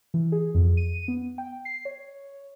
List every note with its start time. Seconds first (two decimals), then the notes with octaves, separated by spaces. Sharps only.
0.14 E3
0.32 G#4
0.55 F2
0.77 D#7
1.08 B3
1.38 G5
1.65 C7
1.85 C#5